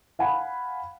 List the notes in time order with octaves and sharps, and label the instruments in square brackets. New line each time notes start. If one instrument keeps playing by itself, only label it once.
[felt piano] F5 F#5 G#5 B5